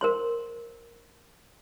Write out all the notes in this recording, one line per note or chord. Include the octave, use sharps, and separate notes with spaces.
A#4 C5 C6